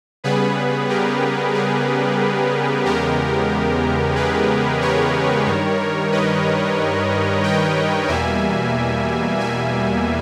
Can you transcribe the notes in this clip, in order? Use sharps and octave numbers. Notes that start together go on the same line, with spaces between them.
C#3 G3 B3 G#4 B4
G4 A#4
G#4
E2 C#3 G#3 B3 G4 A#4
G#4 B4
A#4 C#5
G2 D#3 G3
B4 D#5
D#5 G5
E2 B2 G3 A#3 E5 G#5
E5 G#5